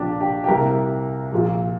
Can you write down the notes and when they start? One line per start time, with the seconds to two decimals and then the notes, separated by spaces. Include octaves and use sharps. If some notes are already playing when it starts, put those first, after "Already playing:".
Already playing: A#1 A#2 D4 G4
0.21 G4
0.44 G4
0.48 C2 C3 A#4
1.32 A#1 A#2